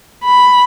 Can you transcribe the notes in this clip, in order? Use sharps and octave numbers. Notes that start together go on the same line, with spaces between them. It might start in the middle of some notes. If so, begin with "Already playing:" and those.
B5